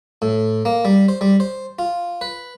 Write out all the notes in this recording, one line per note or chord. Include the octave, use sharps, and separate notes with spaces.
A2
A#3
G3
C5
G3
C5
F4
B4